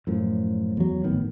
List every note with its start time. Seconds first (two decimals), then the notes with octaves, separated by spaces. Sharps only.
0.07 F#2 A2 F3
0.77 E2 F#3
1.04 G#1 A2 D#3 B3